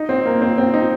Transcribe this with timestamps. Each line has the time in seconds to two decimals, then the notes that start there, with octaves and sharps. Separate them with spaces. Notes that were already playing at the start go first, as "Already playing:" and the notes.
Already playing: D#4
0.09 C4
0.25 A#3
0.41 C4
0.58 C4
0.74 D#4